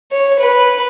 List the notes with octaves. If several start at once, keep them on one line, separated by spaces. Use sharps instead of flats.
C#5
B4